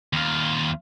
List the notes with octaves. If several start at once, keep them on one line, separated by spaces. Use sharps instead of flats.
D#2 F4